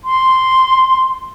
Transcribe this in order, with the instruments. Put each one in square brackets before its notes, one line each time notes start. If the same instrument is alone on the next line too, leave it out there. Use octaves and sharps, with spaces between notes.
[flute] C6